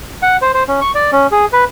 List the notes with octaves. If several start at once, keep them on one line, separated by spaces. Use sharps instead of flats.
F#5
C5
C5
C#4
C#6
D5
C#4
G#4
B4